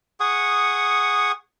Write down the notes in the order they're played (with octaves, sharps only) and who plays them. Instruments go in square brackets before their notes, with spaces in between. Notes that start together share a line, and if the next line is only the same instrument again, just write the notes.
[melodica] G#4 F#5 C#6 D#6